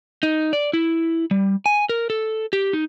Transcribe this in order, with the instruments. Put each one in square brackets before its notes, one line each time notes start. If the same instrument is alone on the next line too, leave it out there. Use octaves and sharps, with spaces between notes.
[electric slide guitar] D#4
D5
E4
G3
G#5
A#4
A4
G4
D#4